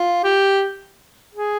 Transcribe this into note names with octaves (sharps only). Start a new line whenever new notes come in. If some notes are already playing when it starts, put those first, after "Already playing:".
Already playing: F4
G4
G#4